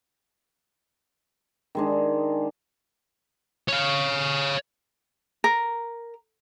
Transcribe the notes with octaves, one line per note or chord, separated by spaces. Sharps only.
D#3 G#3 D4
C#5 F5
A#4